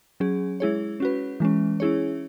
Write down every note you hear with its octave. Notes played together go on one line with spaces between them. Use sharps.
F#3 C#4 G#4
G#3 E4 G#4 C#5
C#4 F#4 B4
E3 G#3 C#4
C#4 E4 G#4 C#5